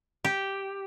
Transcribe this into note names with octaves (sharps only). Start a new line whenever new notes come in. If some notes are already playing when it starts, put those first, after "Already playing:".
G4